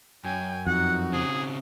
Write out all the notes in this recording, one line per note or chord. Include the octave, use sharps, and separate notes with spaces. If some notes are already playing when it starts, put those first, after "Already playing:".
F#2 G5 G#5
F2 D#4 F#4 F#5
C#3 C4 G#4